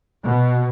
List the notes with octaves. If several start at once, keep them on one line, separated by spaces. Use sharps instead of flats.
B2